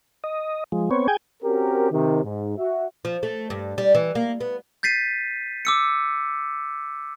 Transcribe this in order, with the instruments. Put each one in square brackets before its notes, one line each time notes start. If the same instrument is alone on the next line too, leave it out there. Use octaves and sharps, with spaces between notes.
[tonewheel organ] D#5
F3 G#3
B3 C4 C#5
G#4 G5 G#5
[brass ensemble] C4 C#4 F#4 G4 A#4
C3 D#3
G#2
F#4 E5
[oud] F3
A3
G2
G3
E3
A#3
B3
[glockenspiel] G6 A6 B6 C7 D#7
D6 E6 C#7